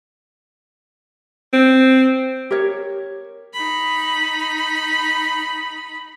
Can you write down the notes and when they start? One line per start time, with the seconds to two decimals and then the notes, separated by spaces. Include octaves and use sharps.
1.53 C4
2.51 G4 A#4 C#5
3.54 D#4 B5